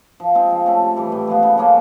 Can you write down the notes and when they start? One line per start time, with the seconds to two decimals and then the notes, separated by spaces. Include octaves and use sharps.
0.20 F3
0.35 G#3 C4 F4
0.51 F3
0.66 A3 C#4
0.82 C3
0.97 E3 G3
1.12 A2
1.27 F3 G#3 B3
1.43 C#3
1.58 F3 A#3 C#4